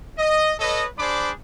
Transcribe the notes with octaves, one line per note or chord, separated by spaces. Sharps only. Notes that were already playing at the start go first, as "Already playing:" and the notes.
D#5
A4 B4 C#5 D#5
D4 G#4 C5 D5 B5 D6